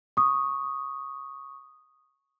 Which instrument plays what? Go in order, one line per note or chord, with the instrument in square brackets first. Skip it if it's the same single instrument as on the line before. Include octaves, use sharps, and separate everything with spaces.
[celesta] C#6 D#6